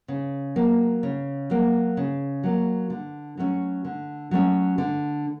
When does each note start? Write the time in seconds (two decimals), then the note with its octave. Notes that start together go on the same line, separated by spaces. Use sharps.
0.08 C#3
0.56 F#3 A#3
1.03 C#3
1.50 F#3 A#3
1.97 C#3
2.44 F#3 A#3
2.90 D3
3.37 F#3 A3 C#4
3.85 D3
4.31 F#3 A3 C#4
4.78 D3